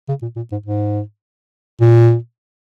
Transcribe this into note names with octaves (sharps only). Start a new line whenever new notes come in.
C#3
A#2
A#2
G#2
G#2
A#2